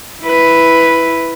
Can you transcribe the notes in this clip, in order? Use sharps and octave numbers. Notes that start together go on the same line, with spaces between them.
E4 B4